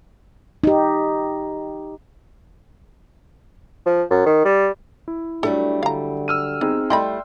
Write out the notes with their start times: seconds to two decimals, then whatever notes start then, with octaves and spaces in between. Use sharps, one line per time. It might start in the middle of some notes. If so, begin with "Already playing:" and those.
0.64 D#4 G4
3.86 F3
4.10 F#2
4.26 D#3
4.45 G3
5.08 E4
5.43 F#3 G3 A3 D4 A4
5.83 D3 F5 A#5
6.28 E6 F6 D#7
6.61 B3 C4 D#4 G#4
6.90 G3 A3 E4 D#5 G5 B5 C6